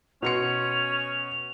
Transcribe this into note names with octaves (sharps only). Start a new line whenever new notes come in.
B2 C#4 C6 C#7 F7